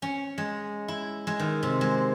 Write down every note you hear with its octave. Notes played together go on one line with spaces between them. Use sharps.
C#4
G#3
E4
G#3
D#3
C3
G#3